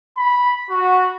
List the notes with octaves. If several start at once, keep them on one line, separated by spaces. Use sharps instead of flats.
B5
F#4